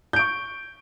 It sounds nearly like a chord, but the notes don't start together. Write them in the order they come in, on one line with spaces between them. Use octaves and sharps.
G6 D7 C#6